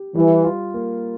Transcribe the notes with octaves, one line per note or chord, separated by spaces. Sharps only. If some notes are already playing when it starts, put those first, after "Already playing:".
Already playing: G4
E3 G3
F4
A#3